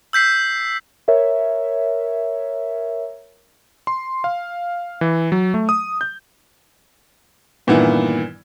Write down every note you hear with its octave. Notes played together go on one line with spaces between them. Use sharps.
E6 G6 B6 C7
A#4 C#5 E5
C6
F5
E3
F#3
A3
D#6
G6
G2 A#2 D#3 E3 B3 E4